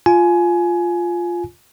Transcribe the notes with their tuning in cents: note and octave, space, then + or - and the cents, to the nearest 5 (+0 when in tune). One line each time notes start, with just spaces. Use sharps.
F4 +0 G#5 +20